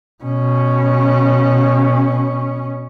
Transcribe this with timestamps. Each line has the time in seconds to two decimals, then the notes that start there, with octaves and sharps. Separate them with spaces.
0.24 B2 C#4